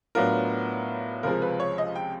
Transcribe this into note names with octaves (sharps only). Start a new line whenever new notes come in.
A2 F#3 B3 D4 F4 A#4
C#2 C3 F3 G#3 A#4
B4
C#5
D#5
G5